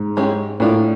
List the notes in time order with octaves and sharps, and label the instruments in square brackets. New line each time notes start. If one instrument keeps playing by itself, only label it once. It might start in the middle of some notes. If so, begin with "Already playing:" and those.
Already playing: [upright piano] G#2
[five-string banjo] G#3 C#4 E4 G4
[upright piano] A2 [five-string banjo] A#3 D4 F4